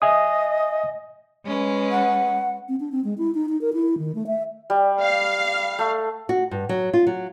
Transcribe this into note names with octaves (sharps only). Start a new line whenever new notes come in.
D#5 E5 G#5 D#6
G#3 C#4 B4
F#5
C4
D4
C4
G#3
E4
D#4
D#4
A#4
E4
D#3
A3
E5
G3
F5
A3
F#4
G2
F#3
F4
F#3